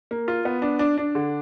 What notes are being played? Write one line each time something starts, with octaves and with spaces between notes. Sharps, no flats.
A#3
F4
B3
D4
D4
D4
D3